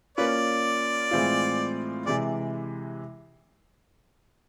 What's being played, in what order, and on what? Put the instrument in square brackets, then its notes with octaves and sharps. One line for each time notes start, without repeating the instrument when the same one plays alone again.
[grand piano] A#3 C#4 F4 [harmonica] B4 D5
[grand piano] A2 E3 G#3 C4 F4
[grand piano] C3 E3 G#3 [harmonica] D5